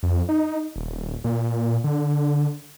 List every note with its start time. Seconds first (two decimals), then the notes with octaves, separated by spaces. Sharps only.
0.03 F2
0.29 D#4
0.76 D#1
1.24 A#2
1.84 D3